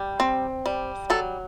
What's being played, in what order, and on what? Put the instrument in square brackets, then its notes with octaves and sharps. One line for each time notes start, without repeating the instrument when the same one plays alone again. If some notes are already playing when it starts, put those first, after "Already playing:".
Already playing: [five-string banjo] G3
C4
G3
F#3 A4